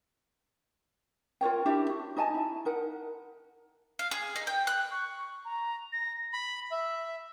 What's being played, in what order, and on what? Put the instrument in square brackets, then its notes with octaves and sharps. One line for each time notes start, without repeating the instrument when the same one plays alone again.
[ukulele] F4 A#4 C#5 G5
D4 E4 G4 E5
F#4
D#4 D#5 G#5 A5
E4
D#4 A#4 F#5
[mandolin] F5
G#4
D#4
G5
F#6
[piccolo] C#6
A#5
A#6
[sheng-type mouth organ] B5
E5